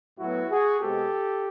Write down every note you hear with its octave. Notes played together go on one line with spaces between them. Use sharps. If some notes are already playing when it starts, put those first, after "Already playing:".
A2 F#3 B3 E4 F#4
F#4 G#4
B2 G#3 C4 G4 A4